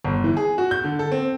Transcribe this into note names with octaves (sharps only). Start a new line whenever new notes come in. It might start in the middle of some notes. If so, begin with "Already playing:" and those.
G1
E3
G#4
F#4
G6
D3
A4
C4